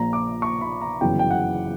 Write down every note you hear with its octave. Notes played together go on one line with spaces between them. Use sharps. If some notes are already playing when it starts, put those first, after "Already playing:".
Already playing: A#1 A#2 A#5
D6
C#6
B5
A#5
G1 F#2 C#3 E3 G5
G5
F#5